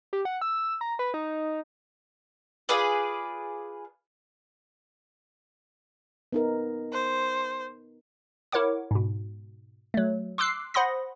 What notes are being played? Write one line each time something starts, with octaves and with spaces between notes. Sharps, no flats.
G4
F#5
E6
A#5
B4
D#4
F4 G#4 B4 D5
B3 D#4 A#4
C5
E4 A#4 C#5 F#5 D6
G#2 B2
F#3 A3
C6 D6 E6 F#6 C7
C5 F#5 B5 C6 D#6 A#6